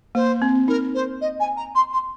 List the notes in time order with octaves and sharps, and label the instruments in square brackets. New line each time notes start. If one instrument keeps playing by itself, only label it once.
[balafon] A#3 [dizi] C5
[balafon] C4
[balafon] D#4 [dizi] A#4
[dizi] C5
D#5
G#5
A#5
C6
C6